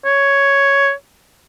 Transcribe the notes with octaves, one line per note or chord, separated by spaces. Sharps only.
C#5